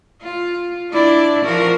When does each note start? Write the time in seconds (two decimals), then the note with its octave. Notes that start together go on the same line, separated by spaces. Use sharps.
0.22 F4
0.92 D4 E4 D5
1.45 F3 F#4 A#4